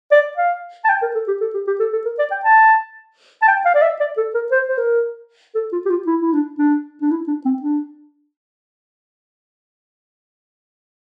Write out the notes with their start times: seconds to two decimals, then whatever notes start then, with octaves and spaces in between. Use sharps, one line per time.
0.12 D5
0.37 F5
0.84 A5
0.89 G5
1.02 A#4
1.15 A4
1.28 G4
1.41 A4
1.54 G4
1.67 G4
1.80 A4
1.93 A4
2.05 A#4
2.19 D5
2.31 G5
2.45 A5
3.42 A5
3.48 G5
3.65 F5
3.75 D5
3.82 E5
4.00 D5
4.17 A4
4.34 A#4
4.51 C5
4.69 C5
4.78 A#4
5.55 A4
5.72 F4
5.86 G4
5.90 F4
6.07 E4
6.21 E4
6.33 D4
6.59 D4
7.02 D4
7.11 E4
7.28 D4
7.45 C4
7.62 D4